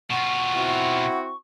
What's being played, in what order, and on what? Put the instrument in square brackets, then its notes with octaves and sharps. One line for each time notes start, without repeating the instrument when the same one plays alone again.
[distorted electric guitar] B2 F4 [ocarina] F#5 [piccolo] C#6
[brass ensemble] C4 E4 F#4